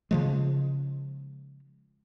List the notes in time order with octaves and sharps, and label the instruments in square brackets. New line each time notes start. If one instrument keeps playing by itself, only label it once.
[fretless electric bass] C#3 F3 G#3